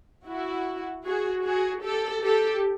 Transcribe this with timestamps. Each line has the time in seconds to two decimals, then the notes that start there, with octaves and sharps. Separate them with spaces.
0.26 E4 F#4
1.05 F#4 G#4
1.44 F#4 G#4
1.83 G4 A4
2.23 G4 A4